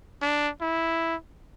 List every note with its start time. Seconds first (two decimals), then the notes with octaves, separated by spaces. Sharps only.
0.22 D4
0.61 E4